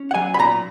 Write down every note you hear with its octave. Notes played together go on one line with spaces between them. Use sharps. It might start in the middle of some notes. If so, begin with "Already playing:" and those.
Already playing: C#4
F#5
F#3 G#5
B5
A#2 A#5